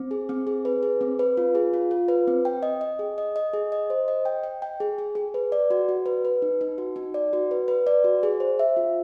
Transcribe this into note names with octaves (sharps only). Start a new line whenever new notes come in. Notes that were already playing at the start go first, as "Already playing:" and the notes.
Already playing: C4
G#4
C4
G#4
B4
G#4
C4
B4
F4
G#4
F4
F4
B4
C4
G5
D#5
D#5
G#4
D#5
D#5
G#4
D#5
C5
D#5
G5
G5
G5
G#4
G#4
G#4
B4
D5
F#4
F#4
B4
B4
D#4
D#4
F#4
D#4
D5
F#4
B4
B4
D5
F#4
G#4
C5
E5
F4